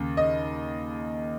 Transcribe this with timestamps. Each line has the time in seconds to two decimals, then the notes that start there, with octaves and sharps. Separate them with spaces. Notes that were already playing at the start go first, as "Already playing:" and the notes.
Already playing: D#2 C#3
0.17 D#5